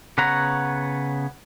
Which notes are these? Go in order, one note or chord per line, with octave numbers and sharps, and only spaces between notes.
C#3 B3 C#5 F#5 A#5